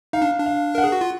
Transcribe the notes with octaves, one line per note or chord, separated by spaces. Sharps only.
D#4 F5
D4
D4
F5
A#4 F#5
G#4
F#4
F4